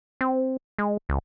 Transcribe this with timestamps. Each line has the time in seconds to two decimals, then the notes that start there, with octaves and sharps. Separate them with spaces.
0.21 C4
0.78 G#3
1.09 C#2